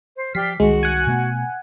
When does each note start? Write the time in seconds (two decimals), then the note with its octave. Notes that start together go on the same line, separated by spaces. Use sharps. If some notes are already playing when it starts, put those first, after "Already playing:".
0.16 C5
0.35 F3 G4 D5 F6 B6 C7
0.60 C2 D#3 G#3 F#4
0.83 F#5 G#5
1.07 B2 A3 B3